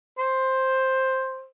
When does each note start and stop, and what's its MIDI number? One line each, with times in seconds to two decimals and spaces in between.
0.18 1.46 72